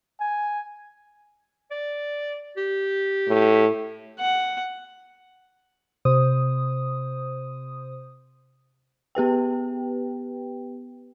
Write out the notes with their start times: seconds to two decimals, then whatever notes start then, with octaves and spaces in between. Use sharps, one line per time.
0.21 G#5
1.71 D5
2.57 G4
3.28 A2
4.19 F#5
6.05 C3 C5 D#6
9.15 B3 G4 B4 G5